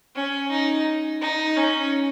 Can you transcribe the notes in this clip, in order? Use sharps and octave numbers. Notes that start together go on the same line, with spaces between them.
C#4
D#4
D#4
C#4